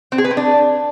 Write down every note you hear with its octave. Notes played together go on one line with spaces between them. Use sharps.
C4
G#4
B4
C4
D4